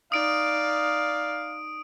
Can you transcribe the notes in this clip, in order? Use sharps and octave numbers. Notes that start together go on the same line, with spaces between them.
D#4 D5 F5 D#6 D7